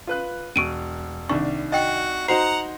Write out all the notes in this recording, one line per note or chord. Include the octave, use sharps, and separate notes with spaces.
F4 B4 F#6
E1 C#6 D7 D#7
C2 D#3 D4 C#6
F#4 D#5 G5
D#4 F#4 C5 F#5 A#5 C7